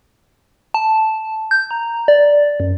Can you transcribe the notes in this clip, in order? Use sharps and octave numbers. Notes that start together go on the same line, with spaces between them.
A5
G6
A#5
D5
F#2